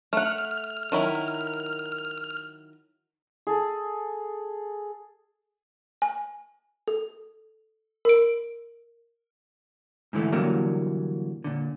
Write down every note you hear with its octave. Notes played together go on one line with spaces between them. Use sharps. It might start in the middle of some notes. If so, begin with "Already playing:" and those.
A3 F#5 F6
D#3 F#3 E4
G#4 A4
G#5
A4
A#4 D7
G#2 D3 E3 G#3 A3
A#2 D3 E3 F#3 G3 A#3
A#2 D3